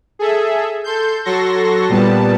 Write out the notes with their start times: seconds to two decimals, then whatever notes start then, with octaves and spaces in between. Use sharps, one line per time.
0.19 G#4 A4 E5
0.84 A4 C6 G6
1.25 F#3 F#4 A4 C6 C#6 A#6
1.89 A#2 G3 B3 A5